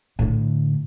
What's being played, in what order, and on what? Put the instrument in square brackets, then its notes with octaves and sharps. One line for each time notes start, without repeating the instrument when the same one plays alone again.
[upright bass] A2 D3